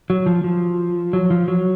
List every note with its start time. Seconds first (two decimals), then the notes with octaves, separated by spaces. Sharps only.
0.10 F#3
0.26 F3
0.44 F3
1.13 F#3
1.30 F3
1.48 F#3